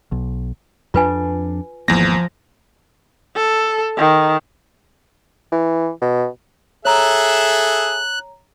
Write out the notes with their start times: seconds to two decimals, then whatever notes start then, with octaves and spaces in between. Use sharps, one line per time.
0.12 B1
0.94 F2 D4 F4 B4 G#5
1.88 G#1 E2 F3 A#3 A#6
3.36 A4
3.98 D#3
5.52 E3
6.02 B2
6.85 G#4 A4 C#5 E5 A#5 F#6